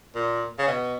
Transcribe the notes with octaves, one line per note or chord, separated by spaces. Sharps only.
A#2
C#3
B2